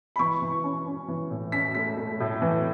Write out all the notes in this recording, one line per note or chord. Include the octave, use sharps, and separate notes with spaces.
B5
E3 C#6
E3
C#4
C#4
E3
A2
C#4 B6
A3 B6
A3
A2
E3